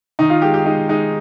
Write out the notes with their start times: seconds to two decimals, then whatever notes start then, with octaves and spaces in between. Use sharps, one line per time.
0.19 D#3 D#4
0.30 F4
0.42 G#3 G4
0.54 G4
0.65 G#3 D#4
0.89 G#3 D#4